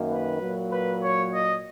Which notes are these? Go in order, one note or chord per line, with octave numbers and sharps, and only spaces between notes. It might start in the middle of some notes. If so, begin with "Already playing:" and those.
Already playing: F#2 D#3 A#3
B4
A#2 F#3 A#3
B4
C#5
D#5